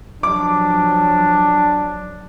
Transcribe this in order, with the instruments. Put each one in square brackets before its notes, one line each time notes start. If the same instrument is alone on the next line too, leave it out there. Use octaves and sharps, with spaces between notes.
[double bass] F3 F#3 [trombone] D4 [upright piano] D6